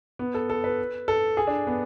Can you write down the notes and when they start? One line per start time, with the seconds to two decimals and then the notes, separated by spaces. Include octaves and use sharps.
0.19 B3
0.34 A4
0.50 A4
0.64 B4
1.08 A4
1.37 G#4
1.47 D4
1.67 B3